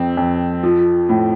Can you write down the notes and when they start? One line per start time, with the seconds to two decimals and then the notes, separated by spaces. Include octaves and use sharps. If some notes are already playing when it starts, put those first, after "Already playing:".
Already playing: F2 C4
0.17 F2
0.63 F3
1.09 A2